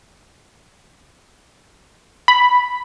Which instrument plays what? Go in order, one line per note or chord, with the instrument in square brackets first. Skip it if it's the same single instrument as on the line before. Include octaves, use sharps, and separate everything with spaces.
[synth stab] B5